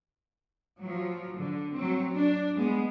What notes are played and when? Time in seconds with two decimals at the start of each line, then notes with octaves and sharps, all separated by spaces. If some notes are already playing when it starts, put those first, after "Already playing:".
0.81 F3 F#3
1.35 D3
1.71 F#3 C4
2.12 D4
2.55 G#3 B3